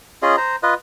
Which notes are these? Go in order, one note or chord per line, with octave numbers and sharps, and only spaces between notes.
C#4 F4 G#4 D#5
C5 A#5
F4 B4 D#5